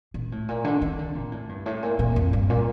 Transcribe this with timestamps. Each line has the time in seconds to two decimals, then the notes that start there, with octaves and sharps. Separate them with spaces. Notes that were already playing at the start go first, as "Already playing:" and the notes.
0.14 A#2
0.32 A2
0.49 A#2
0.64 D3
0.81 D#3
0.99 D3
1.15 A#2
1.32 A2
1.49 G2
1.66 A2
1.83 A#2
1.99 A#2
2.16 F2
2.33 G2
2.50 A#2